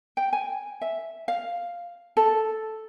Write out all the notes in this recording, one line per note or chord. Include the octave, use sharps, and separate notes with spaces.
G5
G#5
E5
F5
A4